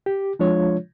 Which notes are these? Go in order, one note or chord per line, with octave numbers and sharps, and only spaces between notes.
G4
F3 G#3 D4 F4 C#5